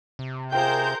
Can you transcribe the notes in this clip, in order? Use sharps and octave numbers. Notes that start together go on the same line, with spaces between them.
C3
F4 G#4 A#4 C5 G5 G6